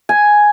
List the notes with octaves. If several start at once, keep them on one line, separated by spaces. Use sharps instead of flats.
G#5